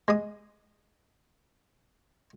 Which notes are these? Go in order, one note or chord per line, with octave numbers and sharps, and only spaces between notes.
G#3 D#6